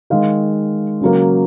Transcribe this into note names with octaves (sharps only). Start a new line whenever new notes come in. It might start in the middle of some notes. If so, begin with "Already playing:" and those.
D#3 G#3 F5
C#3 F#3 A#3